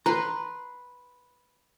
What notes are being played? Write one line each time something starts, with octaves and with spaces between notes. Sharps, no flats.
B4 A#5 C6